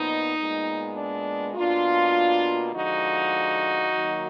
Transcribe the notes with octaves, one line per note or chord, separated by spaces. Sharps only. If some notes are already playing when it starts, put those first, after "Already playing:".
Already playing: A#2 F3 B3 D#4
A#2 G#3 B3
D4
B2 A#3 D4 F4
D3 F3 G#3 D#4 F#4
D#3 F#3 A#3